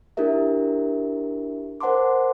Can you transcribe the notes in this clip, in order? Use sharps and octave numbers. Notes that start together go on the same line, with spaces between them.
D4 E4 G4 A#4 E5
A#4 C5 F#5 A5 C6 D6